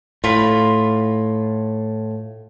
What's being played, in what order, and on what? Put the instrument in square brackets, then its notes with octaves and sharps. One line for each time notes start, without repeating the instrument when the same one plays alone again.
[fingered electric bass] A2 [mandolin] F4 B5